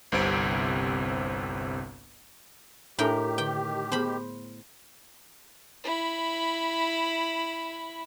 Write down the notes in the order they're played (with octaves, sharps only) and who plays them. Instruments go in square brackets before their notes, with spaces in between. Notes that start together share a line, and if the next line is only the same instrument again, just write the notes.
[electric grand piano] G1 C2 C3 C4 D7
[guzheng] A2 A#4 G5 [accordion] D#3 G4 [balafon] D4 A4 G#5
[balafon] D3 [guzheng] G5
[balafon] B3 G#4 [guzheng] C5 B5
[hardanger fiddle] E4 B5